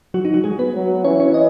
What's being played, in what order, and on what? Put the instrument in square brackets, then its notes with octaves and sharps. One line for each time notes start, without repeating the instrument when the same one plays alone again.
[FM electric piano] F#3 F#4
D#4
F#3 F#4
G#3 G#4
B3 B4
[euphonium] F#3
[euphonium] E3 [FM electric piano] C#4 C#5
[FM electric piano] C#4 C#5
D#5